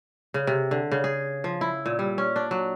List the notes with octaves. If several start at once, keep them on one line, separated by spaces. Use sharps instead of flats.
C#3
C3
D3
C#3
G#4
F3
E4
A#2
G3
C#4
D4
F#3